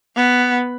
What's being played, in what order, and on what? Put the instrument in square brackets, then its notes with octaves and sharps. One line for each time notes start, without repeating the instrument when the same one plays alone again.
[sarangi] B3